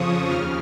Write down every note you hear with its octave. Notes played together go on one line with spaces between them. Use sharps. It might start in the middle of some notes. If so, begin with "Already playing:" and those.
Already playing: F2 C#3 F3 C#6 D#6
D#2 C#3 F6